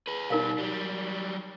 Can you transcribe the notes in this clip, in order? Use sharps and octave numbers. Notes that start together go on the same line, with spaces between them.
G#4 B4
B2 G3 D#4 A#4 F5
F#3 G3